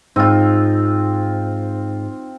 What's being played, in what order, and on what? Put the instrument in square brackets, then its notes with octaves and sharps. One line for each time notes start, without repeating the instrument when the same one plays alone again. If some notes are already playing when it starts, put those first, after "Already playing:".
[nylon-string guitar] G#2 [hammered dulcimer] C4 F4 [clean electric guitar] D#4